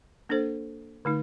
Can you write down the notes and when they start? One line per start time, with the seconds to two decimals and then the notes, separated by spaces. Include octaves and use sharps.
0.29 A#3 D4 A4 C5
1.05 D3 A3 D#4